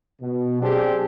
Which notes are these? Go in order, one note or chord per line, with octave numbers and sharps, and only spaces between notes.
B2
F#3 C4 D4 G4 G#4